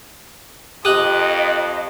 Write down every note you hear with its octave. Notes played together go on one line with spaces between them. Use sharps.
F2 G4 D#5 D#6 F#6